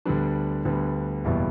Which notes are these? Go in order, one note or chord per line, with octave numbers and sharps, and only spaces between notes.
D2 D3 G3 B3 D4
D2 D3 G3 B3
F#1 E2 B2 G3 B3 E4